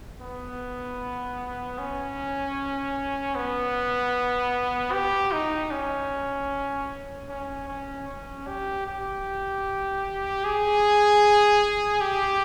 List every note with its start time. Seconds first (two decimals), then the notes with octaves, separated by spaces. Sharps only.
0.21 B3
1.79 C#4
3.36 B3
4.92 G4
5.32 D#4
5.71 C#4
7.29 C#4
7.68 C#4
8.09 C#4
8.47 G4
8.87 G4
10.45 G#4
12.01 G4